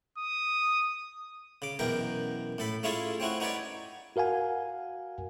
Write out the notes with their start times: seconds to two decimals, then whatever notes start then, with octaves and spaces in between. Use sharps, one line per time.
0.18 D#6
1.62 C#3 D6
1.79 F#2 B2 E3 A#4 G5
2.58 A2 A4 B5
2.83 A3 C#4 E4 F4 G#4 A4
3.20 C4 C#4 E4 F#4
3.40 D#4 F#4 B4 C#5 D5
4.16 F#4 A#4 F5 F#5 G#5